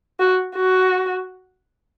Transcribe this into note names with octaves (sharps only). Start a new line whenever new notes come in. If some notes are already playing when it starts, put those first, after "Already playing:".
F#4
F#4